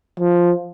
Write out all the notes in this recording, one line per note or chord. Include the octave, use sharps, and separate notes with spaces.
F3